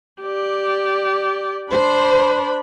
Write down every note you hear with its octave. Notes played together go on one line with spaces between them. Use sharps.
G4 D5
D4 C5 B5